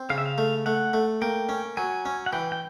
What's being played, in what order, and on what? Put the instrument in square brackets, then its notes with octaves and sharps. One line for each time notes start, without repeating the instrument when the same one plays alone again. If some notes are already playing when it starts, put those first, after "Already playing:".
Already playing: [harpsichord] C4
[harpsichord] C#3 [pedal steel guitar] F5
[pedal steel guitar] E5
F5
[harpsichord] A3
[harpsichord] A3 [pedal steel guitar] F#5
[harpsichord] A3
[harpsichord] A#3 [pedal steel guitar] G5
[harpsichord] C#4
[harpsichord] F#3 [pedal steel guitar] G#5
[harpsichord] C#4
[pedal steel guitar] F#5
[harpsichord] E3 [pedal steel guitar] G5
[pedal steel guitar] G5